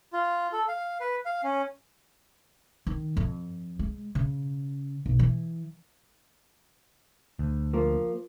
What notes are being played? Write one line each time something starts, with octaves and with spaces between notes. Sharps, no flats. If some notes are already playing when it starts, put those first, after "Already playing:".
F4
A4
F5
B4
F5
C#4
D#3
F2
G#3
C#3
B1
E3
D2
F3 A#3